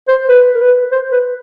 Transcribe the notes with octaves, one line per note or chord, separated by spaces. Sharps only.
C5
B4
A#4
B4
C5
B4